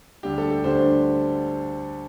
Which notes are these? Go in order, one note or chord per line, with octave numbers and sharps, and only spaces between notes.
D2 D3 G3 D4 G4
A4
G4
D2 D3 G3 D4 C5